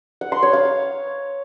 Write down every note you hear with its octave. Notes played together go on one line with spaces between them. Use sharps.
F#5
C6
C#5
F5